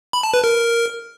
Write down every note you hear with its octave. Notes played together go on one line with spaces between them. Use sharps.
B5
A5
B4
A#4